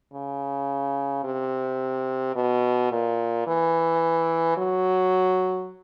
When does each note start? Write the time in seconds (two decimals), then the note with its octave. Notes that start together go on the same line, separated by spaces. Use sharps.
0.13 C#3
1.24 C3
2.35 B2
2.91 A#2
3.47 E3
4.57 F#3